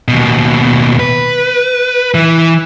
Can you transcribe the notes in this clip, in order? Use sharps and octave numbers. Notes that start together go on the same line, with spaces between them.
D#2 B2
B4
E3